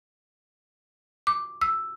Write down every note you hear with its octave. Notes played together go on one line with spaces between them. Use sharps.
D6
E6